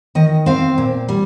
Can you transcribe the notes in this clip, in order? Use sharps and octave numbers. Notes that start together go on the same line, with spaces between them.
D#3 D#5
C4 F5
A#2
G3